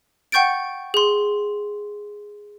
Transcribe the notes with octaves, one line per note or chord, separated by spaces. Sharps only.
F#5 G5 C#6 G6 A6 D7
G#4 C6